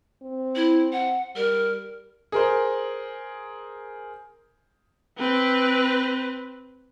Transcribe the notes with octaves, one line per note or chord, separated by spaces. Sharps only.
C4
E4
F#5
G3 A#4
G#4 A#4 C5
C4 B4